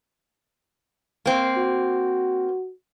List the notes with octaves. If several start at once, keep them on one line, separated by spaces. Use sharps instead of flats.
A#3 C4
F#4